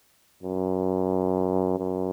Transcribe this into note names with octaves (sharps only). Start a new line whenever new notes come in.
F#2
F#2